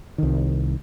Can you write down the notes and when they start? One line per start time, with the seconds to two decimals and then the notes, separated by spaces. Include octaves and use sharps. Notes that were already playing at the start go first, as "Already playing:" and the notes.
0.18 C2 D#3